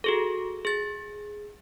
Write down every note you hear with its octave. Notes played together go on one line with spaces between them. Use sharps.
F#4 G#4 A4
G#4 A6